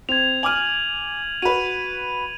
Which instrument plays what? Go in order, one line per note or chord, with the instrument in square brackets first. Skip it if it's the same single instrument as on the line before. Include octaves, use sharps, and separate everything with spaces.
[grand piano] C4 [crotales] G#6 F7
[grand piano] G#5 D6 F6 [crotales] D#7 F#7
[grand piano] F#4 B4 [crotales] D#7